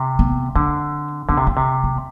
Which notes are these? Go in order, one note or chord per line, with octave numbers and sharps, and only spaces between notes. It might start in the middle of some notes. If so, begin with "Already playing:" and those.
Already playing: C3
B3
D3 C4
D3 B3
C3
C4
C3
B3